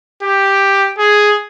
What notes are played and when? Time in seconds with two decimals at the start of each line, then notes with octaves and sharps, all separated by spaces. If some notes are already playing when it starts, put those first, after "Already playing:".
0.23 G4
0.98 G#4